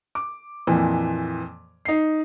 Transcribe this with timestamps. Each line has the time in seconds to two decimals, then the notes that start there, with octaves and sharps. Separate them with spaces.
0.15 D6
0.67 F2 A#2 E3
1.85 D#4 C7